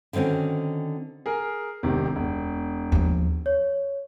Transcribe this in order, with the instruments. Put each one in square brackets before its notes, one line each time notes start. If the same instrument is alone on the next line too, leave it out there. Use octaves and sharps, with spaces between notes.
[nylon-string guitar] D3 D#3 C4 C#4 F#4
[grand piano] G#4 A#4
E1 C3 D#3
E1
[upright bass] D#2 F3
[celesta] C#5